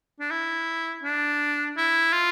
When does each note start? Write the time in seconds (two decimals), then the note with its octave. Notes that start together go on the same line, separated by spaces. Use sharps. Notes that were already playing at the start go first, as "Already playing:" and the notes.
0.20 D4
0.31 E4
1.03 D4
1.77 E4
2.13 F4